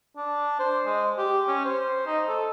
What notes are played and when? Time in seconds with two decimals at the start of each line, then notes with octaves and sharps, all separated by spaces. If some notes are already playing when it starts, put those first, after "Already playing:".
0.17 D4
0.60 C5
0.86 G#3
1.18 G4
1.48 C#4
1.65 C5
2.06 D#4
2.28 A4